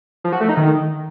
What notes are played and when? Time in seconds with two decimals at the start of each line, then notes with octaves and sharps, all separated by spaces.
0.24 F3
0.33 F#4
0.41 A3
0.49 D#4
0.57 D#3